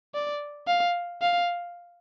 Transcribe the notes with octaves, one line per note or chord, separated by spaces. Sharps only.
D5
F5
F5